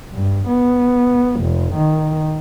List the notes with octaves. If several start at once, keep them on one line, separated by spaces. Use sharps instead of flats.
G2
B3
F1
D#3